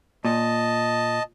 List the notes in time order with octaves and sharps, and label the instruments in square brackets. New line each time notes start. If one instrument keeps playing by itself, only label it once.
[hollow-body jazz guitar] A#2 [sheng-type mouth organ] D#5 A5